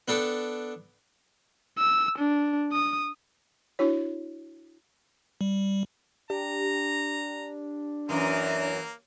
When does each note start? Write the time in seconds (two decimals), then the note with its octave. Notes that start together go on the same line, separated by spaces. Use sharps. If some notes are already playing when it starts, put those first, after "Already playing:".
0.08 B3 D4 A4 G5
1.78 E6
2.19 D4
2.72 D#6
3.79 D4 E4 F#4 C#5
5.41 G3
6.30 D4 G4 A#5
8.09 F#2 E3 A#3 A#4